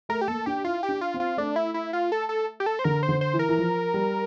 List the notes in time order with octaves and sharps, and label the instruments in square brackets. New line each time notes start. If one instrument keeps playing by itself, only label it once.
[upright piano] A3 [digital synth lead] A#4
[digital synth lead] G4
[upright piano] A#3 [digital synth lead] A4
[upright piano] D4 [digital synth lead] G4
[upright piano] E4 [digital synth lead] F4
[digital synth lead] G4
[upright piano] D4
[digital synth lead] F4
[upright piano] C4
[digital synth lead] F4
[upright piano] A3 [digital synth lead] D4
[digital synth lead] E4
E4
F4
A4
A4
G4
A4
C5
[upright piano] D3 [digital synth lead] A#4
[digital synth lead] C5
[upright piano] D3
[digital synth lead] C5
[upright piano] E3
[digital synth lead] A#4
[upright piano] E3
F3
G3